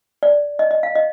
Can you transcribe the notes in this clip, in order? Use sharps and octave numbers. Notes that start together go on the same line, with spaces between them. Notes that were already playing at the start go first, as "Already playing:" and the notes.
D5
D#5
D#5
F5
D#5